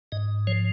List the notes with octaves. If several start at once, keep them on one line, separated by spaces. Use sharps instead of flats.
G#2 D#5
F3 C#5